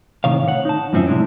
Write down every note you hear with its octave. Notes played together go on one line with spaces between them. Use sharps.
A2 C3 D#3 C#5 F5
C#5 F#5
D#4 A5
F#2 A2 F3 C4 C#4 E5
C3 G#3 D4 E4